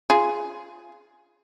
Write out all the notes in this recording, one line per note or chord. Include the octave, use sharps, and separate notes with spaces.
F4 G#4